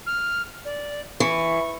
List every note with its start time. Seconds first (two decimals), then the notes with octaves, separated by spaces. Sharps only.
0.06 F6
0.65 D5
1.20 E3 C#6